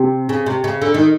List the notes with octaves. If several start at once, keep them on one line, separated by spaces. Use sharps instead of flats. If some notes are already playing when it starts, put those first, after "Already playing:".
Already playing: C3
C#3
C3
C#3
D3
D#3